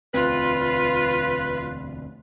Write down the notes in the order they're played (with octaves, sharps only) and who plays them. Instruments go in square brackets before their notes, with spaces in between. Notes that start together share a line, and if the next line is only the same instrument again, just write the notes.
[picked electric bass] E1 D2 C4 [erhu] F4 [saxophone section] B4